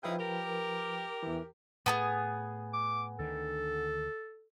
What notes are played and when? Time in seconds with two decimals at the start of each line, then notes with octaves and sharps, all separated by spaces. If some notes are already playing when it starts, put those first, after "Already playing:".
0.03 C#3 F3 D#4 E4 B4 G5
0.19 G4 A#4
1.23 E2 E3
1.86 A2 A3 B3 D4 G#4
2.73 D6
3.19 D2 D3 D#3 A4